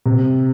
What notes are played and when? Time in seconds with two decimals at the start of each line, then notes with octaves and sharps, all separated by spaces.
0.06 C3